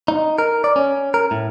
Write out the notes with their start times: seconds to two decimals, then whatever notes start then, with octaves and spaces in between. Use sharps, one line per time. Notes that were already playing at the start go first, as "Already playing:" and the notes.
0.08 D#4
0.38 A#4
0.64 D5
0.76 C#4
1.14 A#4
1.31 A2